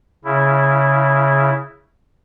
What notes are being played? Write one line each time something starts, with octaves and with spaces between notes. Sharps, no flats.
C#3 E4